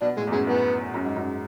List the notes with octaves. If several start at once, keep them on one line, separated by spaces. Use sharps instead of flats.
B2 D4
A2 G#3
E2
F#2 G#3
E2 B3
F#2
G#2
F#2